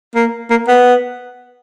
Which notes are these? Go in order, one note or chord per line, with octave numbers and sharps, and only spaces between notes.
A#3
A#3
B3